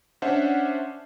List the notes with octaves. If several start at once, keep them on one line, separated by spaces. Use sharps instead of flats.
C#4 D4 C5 E5 F#5